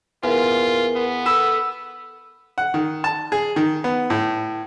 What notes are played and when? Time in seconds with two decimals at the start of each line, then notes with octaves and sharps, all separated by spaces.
0.24 E2 F4 A#4
0.96 B3
1.26 A4 B5 E6
2.58 F#5
2.74 D#3
3.04 A5
3.32 G#4
3.56 D#3
3.84 B3
4.10 A2